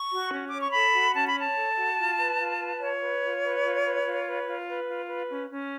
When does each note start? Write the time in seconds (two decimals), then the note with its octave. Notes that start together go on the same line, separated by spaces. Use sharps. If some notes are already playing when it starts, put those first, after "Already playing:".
Already playing: C#6
0.11 F#4
0.32 C#4
0.48 C#5 D6
0.60 C#6
0.73 A4 B5
0.94 F#4
1.15 C#4 A5
1.27 B5
1.35 C#5 A5
1.56 A4
1.77 F#4
1.98 F4
2.19 B4
2.39 F4
2.60 B4
2.80 F4 C#5
3.01 B4
3.22 F4
3.43 B4
3.64 F4
3.84 B4
4.06 F4
4.26 B4
4.46 F4
4.67 B4
4.88 F4
5.09 B4
5.30 C#4
5.50 C#4